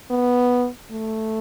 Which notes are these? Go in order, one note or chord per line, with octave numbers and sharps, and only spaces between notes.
B3
A3